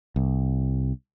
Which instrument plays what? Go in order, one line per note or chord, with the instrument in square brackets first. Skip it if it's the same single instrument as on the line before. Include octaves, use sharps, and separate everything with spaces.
[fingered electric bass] C2